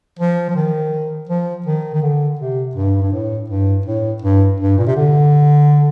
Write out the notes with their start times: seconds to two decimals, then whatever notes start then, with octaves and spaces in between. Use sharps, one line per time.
0.19 F3
0.49 F3
0.56 D#3
1.29 F3
1.66 D#3
1.94 D#3
2.02 D3
2.39 C3
2.75 G2
3.02 G2
3.12 A2
3.50 G2
3.86 A2
4.22 G2
4.60 G2
4.78 A#2
4.87 C3
4.96 D3